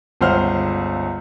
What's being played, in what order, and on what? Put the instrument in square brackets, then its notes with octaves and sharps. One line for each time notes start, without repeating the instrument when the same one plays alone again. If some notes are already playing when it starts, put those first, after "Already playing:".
[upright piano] G1 C#2 C5 E5 F#5 F6